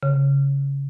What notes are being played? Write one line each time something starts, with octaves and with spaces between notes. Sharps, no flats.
C#3